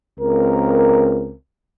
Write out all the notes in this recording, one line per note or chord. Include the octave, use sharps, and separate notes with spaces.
C#2 C4 A#4